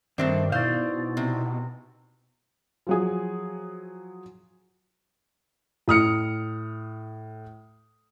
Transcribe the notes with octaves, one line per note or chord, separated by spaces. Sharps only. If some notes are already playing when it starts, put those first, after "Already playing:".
G2 D#3 A3 C4 D4 C5 E5
B2 D#4 E4 C5 D5 F5 C#6
C3
F3 F#3 G#4
A2 D#6 F6 C#7